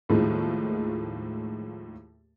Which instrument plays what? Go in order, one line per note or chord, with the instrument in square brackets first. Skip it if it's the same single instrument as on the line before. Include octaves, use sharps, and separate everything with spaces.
[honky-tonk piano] D#2 A2 D#3 F3 G#3